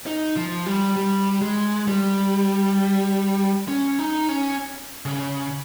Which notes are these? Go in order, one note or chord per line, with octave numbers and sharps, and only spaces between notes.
D#4
F3
G3
G3
G#3
G3
C#4
D#4
C#4
C#3